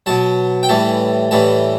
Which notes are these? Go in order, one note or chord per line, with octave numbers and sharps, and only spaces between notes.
B2 F#3 A5
G5
A2 E3 G3 A5
A2 E3 G3 A5